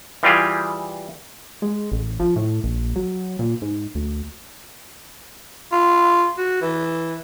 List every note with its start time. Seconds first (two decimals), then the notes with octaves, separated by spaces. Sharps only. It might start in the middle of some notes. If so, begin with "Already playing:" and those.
0.23 E3 G3 F4 G4 G#4
1.62 G#3
1.92 A1
2.20 F3
2.36 A2
2.64 A#1
2.96 F#3
3.39 A#2
3.62 G#2
3.95 D2
5.72 F4
6.38 F#4
6.61 E3